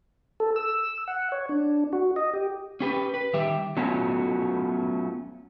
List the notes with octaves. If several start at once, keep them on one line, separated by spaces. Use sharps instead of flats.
A4
E6
F#5
C#5
D4
F#4
D#5
G4
C#4 G4 B4
B4
D#3 G3 G4 E5
F#3 A3 B3 C#4 F4 F#4